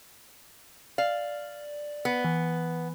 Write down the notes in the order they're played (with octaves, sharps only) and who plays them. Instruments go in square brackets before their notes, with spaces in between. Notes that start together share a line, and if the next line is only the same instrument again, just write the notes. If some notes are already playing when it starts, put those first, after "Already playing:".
[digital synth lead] D5 [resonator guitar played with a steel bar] F5
[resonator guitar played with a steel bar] B3
[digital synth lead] E3